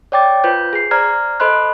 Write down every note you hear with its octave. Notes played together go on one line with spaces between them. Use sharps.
C#5 D5 G5 D6 A6
F4 B4 C5 G6
G#4 C7
C5 D5 A#5 F6 G#6
A4 C5 D#5 B5 C6 F#6